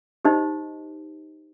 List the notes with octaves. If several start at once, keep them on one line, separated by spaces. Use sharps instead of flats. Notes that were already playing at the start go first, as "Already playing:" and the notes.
D#4 G4 C5 D#5